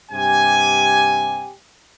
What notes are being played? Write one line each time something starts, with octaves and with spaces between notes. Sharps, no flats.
G2 C3 G4 G#5